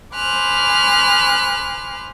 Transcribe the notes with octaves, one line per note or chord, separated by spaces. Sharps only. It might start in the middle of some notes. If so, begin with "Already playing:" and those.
C5 G#5 B5 D6 F6 F#6